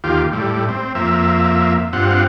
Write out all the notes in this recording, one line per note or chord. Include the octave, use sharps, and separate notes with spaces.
D#2 F4 G4
A2 G3
C4
F2 A#3 E5
G2 C4 F4 F#5